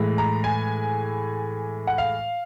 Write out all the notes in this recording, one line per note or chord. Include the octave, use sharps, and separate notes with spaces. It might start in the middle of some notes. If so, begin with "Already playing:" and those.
Already playing: A2 E3 G#3
A#5
G#5
F#5
F5